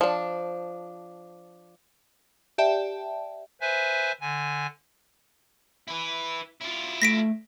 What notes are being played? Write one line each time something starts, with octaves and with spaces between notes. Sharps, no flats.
F3 D4
G4 D5 E5 G5 A5
B4 C5 E5 G#5
D3 G#5
E4 B4
E4 F4
A3 A#6 B6 D7